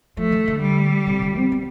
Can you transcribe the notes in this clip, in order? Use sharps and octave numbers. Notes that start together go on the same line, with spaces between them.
F3 A3
E3
D3
G3
C3
D3
C4
B3